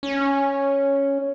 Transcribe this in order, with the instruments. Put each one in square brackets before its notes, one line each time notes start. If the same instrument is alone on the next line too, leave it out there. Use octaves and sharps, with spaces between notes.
[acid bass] C#4